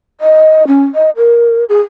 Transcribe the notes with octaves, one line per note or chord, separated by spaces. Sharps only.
D#5
C#4
D#5
A#4
G#4